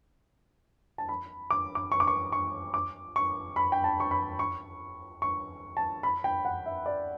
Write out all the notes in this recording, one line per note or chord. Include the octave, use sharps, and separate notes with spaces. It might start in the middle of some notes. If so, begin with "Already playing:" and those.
A5
B5
D6
D6
C#6
D6
C#6
C#6
D6
C#6
B5
G5
A5
C#6
B5
C#6
C#6
A5
B5
G5
F#5
E5
D5